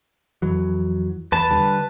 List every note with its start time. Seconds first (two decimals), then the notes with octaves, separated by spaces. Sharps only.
0.42 F2 E3 F#3
1.32 E2 B4 A5
1.50 D3 G3